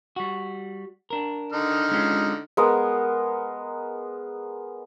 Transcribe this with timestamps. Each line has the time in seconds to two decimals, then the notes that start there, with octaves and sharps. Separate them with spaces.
0.16 G3 F#4
1.10 D4 A#4
1.53 D3 D#4 F6
1.91 G#3 C#4 F4
2.57 G#3 B3 A#4 F#5